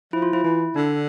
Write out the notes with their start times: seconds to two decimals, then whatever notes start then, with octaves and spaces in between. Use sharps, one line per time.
0.13 F3 E4
0.22 F4
0.32 F3 E4
0.44 E3 E4
0.76 D3 D4